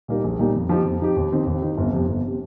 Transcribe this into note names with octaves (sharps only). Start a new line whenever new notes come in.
A#2 G3 A#3 D#4
A#1
A#2 G3 A#3 D#4
F2
F3 D#4 G4
F2
F3 D#4 G4
D#2
D#3 C4
D#2
D#3 C4
G1
F2 C3
G1
C3